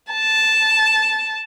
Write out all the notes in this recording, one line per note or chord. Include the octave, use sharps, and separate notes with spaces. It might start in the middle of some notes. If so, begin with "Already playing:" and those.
A5